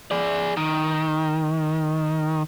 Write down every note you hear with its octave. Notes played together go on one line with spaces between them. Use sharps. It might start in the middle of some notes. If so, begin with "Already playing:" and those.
G#4 D5
D#3